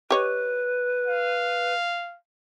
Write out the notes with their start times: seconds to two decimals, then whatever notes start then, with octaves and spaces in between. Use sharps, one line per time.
0.10 G4 B4 C#5 D#5
1.07 F5